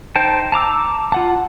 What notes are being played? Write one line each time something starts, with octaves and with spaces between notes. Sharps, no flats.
D#4 C5 G5 A5
A5 A#5 D6 E6
F4 F#5 A5